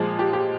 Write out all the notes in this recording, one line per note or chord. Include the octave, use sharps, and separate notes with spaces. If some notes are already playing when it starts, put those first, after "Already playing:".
Already playing: A#2 F3 G#3
G4
G4